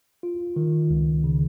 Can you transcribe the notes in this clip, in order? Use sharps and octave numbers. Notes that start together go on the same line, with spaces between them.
F4
D#3
C#2
C#3